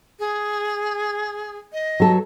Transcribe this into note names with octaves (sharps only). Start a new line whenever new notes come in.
G#4
D#5
F#3 A4